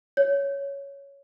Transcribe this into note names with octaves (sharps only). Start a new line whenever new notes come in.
C#5